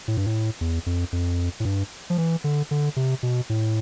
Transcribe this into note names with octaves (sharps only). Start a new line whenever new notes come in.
A2
G2
A2
E2
F2
F2
A2
G2
F3
E3
D3
D3
C3
B2
A2